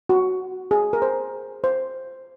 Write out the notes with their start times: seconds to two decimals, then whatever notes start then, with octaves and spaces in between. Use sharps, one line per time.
0.09 F#4
0.71 G#4
0.93 A#4
1.02 C5
1.64 C5